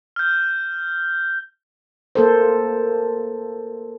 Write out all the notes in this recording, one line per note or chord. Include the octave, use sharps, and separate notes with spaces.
F6 G6
A#3 A4 C5